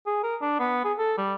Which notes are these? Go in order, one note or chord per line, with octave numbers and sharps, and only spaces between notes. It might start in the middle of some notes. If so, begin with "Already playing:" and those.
G#4
A#4
D4
B3
G#4
A4
G3